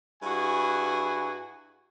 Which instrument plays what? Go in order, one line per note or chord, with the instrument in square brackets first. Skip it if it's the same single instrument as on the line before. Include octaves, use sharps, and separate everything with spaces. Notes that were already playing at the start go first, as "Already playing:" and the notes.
[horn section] G2 E4 F#4 G#4 G#5